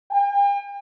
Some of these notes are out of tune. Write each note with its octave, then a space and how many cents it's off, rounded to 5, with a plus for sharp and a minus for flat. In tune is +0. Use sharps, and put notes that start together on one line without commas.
G5 +45